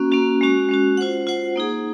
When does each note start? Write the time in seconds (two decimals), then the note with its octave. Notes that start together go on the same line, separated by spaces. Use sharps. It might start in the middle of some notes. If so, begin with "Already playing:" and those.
Already playing: A#3 C#4 F#4
0.12 A#3 C#4 F#4
0.41 G#3 C#4 F#4
0.69 G#3 C#4 F#4
0.97 F4 C5 F#5
1.27 F4 C5 F#5
1.56 A#3 D#4 G#4